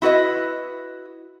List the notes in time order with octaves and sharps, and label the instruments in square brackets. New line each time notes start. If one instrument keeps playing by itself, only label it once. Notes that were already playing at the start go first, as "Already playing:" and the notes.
[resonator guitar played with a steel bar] E4 F#4 B4 D#5